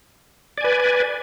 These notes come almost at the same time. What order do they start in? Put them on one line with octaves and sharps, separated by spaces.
D5 G#5 B4